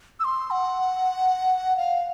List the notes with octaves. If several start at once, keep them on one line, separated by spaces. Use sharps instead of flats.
E6
C6
F#5
F5